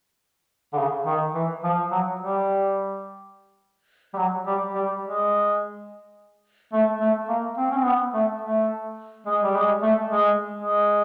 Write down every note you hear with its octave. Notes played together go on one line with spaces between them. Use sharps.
D3
C#3
D#3
E3
F3
F#3
G3
G3
F#3
G3
G3
G#3
A3
A3
A#3
C4
C#4
C4
B3
A3
A3
G#3
G3
G#3
A3
G#3
G#3